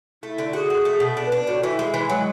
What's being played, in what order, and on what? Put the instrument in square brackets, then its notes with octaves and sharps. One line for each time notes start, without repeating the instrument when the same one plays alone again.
[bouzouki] A3 [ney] E4
[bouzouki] D3
[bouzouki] F#4 [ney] G#4
[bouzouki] F#4
A3
B2
D4
[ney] B4
[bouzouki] D4
[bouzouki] A2 [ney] F#4
[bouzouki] E3 [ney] E4
[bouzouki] G#3
E3
[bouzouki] F#3 [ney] G#3